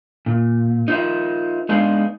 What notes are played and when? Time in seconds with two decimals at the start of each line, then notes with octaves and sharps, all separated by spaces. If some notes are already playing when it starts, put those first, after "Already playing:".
0.26 A#2
0.88 D#4 F4 A#4 C5 E5
1.69 G#3 B3 D4 D#4 F5